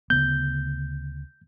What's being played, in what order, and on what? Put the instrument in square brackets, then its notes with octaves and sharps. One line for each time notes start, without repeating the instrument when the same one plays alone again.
[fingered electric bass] D2 C#3 B3 [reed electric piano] G6